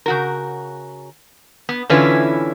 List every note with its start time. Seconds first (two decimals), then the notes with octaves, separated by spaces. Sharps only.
0.06 C#3 F#4 A#4
1.69 B3
1.90 D3 E3 C#4 E4 F4 B4